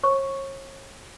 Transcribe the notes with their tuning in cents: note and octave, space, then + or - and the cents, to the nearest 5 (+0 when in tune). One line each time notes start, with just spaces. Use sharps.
C#5 -40 C#6 +0